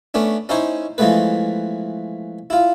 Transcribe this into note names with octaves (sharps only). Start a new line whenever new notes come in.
A3 B3 C#4 D4
C#4 D#4 E4 C5 C#5
E3 F3 G#3 A3 B3 B4
E4 F4